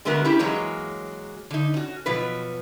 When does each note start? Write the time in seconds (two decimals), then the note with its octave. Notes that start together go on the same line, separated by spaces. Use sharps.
0.05 D3 G#3 A3 B3 F#4 A#4
0.24 C#4 E4 G4
0.39 E3 F#3 G#3 A#3 C#5
1.51 D3 D#4
1.74 C#4 F#4
2.06 B2 F3 F#3 B4